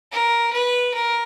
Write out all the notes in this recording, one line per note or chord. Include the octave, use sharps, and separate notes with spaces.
A#4
B4
A#4